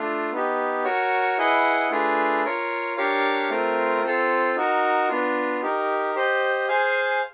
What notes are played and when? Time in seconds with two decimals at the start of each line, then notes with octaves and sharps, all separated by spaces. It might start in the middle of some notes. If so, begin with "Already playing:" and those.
Already playing: A3 D4 F4
0.32 B3 D#4 G4
0.84 F#4 A#4 C#5
1.38 E4 G#4 B4 D#5 F#5
1.91 A3 D4 F4 G#4 B4
2.44 F4 A#4 C#5
2.97 D4 G4 A#4 C#5 F5
3.50 A3 C4 F4 A#4
4.02 C4 F4 A4
4.56 D#4 F#4 A#4
5.09 B3 D4 F4
5.62 D#4 G4 A#4
6.15 G4 C5 D#5
6.68 G#4 C5 F5 G#5